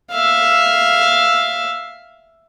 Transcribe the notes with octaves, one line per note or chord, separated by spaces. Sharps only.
E5 F5